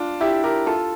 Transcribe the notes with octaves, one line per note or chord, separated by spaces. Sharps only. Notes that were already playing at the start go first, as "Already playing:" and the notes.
Already playing: D4 F4
E4 G4
G4 A#4
F4 A4